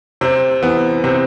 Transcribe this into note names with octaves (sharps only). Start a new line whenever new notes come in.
C3 C4
E3 B3
C3 C4